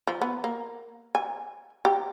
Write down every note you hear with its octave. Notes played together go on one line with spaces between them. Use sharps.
F3
B3
A#3
G#5
G4